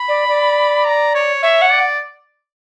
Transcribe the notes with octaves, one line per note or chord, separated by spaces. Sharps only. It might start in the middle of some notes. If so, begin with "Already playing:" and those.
Already playing: B5
D5
D5
A#5
C#5
C#5 E5
F#5
D5